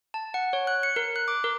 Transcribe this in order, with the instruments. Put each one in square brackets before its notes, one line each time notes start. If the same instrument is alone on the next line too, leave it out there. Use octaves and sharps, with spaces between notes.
[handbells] A5
F#5
C#5
F#6
C#7
A#4
F#6
D6
A#4